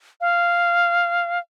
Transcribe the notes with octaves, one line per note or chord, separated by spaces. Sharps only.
F5